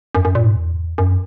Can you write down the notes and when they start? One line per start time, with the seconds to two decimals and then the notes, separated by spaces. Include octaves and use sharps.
0.15 F#2
0.25 F#2
0.35 A#2
0.46 G#2
0.56 E2
0.98 F#2